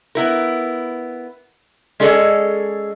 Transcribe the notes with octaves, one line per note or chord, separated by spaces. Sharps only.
B3 E4 A#4
G#3 C#4 G#4 A4 D5 D#5